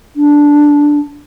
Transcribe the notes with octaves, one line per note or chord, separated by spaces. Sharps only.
D4